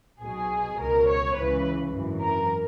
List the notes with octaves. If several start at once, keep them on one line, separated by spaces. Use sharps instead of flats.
B1 B2 G#4
C#2 B2 A#4
C#5
C#2 C#3 E3 B4
G#1 F#2 E3
A#4